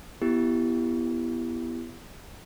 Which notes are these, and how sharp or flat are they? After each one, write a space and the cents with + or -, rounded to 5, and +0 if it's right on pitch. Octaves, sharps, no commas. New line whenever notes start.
B3 +0 E4 +15 G4 +0